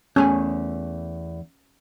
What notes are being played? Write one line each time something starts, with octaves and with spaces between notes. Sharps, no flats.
E2 A3 C#4 G#5